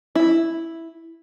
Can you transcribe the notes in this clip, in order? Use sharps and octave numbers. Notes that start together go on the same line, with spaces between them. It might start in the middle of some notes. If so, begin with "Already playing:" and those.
E4